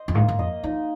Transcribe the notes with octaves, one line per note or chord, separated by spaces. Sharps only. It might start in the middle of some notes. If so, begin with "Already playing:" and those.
Already playing: C5 D#5
F2
G#2 A#3
G#2
F2 D#5
F3 D#4